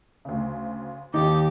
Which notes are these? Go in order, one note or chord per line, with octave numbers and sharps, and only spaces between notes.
D2 C#3
D#2 D#4 G4 D6